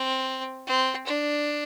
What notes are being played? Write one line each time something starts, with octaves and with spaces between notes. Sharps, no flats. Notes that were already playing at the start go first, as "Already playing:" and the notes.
Already playing: C4
C4
D4